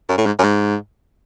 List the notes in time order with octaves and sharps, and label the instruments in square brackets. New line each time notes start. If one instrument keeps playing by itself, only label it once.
[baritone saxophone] F#2
A2
G#2
F#2
G#2